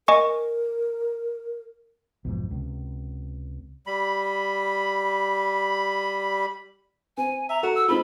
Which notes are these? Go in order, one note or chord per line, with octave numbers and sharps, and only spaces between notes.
A#4 D#5 G#5 C#6
B1 F2 G#2
C#2 C3
G3 B5
C4 G#5
E5 A#5
F#4 A4
E6
G#3 C4 D#4 F4 B5